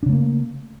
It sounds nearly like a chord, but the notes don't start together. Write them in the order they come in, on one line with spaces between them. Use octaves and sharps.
D4 C#3 A3 A#3